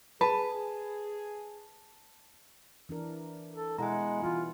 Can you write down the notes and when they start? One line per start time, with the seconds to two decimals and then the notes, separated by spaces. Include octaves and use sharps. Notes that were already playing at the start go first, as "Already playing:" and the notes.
0.21 G#4 B4 A5
2.89 E3 D4 A#4
3.52 A4
3.78 B2 G#3 E4 F#5 G#5 A#5
4.23 E3 G3 F4